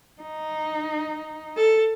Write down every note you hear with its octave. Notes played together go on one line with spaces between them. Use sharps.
D#4
A4